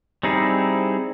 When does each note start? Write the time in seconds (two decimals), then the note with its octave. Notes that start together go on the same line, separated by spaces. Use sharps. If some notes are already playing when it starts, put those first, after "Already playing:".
0.23 G3 C4 D#4 E4 G#4